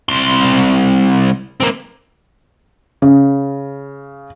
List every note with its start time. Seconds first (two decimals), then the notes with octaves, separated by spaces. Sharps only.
0.09 C2 C6
1.60 A#3 C4
3.02 C#3